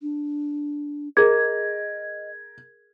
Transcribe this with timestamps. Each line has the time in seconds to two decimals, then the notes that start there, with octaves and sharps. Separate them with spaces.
0.02 D4
1.17 G#4 A#4 D#5 G#6